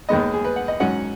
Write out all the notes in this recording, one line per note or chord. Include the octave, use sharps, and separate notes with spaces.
D#2 D#3 G#3 B3 D#5
G#4
B4
F#5
D#5
G#2 F#3 C#4 F#5